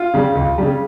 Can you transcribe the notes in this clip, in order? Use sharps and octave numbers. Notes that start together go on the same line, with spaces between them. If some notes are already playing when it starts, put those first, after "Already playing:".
Already playing: F4
C#3 G3
C#2
C#3 G3